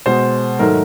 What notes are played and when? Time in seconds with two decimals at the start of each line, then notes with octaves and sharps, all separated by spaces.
0.06 B2 G#3 C5
0.59 G#2 D#3 F#3 A3 A#4